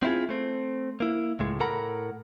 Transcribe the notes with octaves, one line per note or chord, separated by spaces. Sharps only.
C4 C#4 E4 F4 G#4
A3 C4
A#3 E4
C#2 A2 G#3
A2 A4 A#4 F#5 A#5 B5